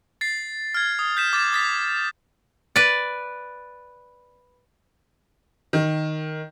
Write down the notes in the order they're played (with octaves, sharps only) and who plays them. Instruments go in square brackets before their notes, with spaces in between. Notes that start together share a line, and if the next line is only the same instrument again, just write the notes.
[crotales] A6 C7
F6 G#6
D#6
G6 B6 E7
D6 A6 E7
D#6 A6 B6
[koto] B4 D5
[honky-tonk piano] D#3